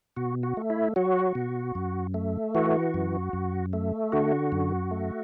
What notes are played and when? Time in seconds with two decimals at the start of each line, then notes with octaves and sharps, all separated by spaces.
0.16 B2 F#4
0.43 F#4
0.57 A3
0.70 E4
0.96 F#3 F#4
1.35 B2
1.75 F#2
2.14 A3
2.55 E3 F#4
2.94 F#2
3.33 F#2
3.73 A3
4.12 D3 F#4
4.52 F#2
4.91 A3